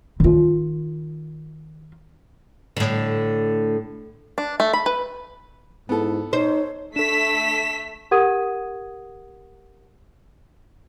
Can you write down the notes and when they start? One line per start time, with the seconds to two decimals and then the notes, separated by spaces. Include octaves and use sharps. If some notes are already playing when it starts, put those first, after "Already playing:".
0.20 D#3 F4
2.77 A2 D3
4.38 D4
4.60 A3
4.73 B5
4.86 B4
5.89 G#2 B3 E4 A4
6.33 D#4 C5 C#5
6.96 A3 D4 A4 B6 E7
8.11 G4 A#4 F#5 D#6 G#6 D#7